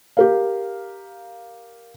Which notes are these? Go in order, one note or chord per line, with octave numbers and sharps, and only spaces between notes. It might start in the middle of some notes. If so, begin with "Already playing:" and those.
G4 A#4 F5